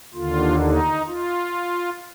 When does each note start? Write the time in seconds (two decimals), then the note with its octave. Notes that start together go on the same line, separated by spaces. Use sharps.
0.14 D#2 D3 F4
0.60 D#4
1.07 F4